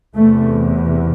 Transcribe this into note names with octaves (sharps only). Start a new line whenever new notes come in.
E2 C3 A3